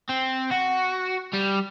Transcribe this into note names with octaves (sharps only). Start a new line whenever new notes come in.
C4
F#4
G3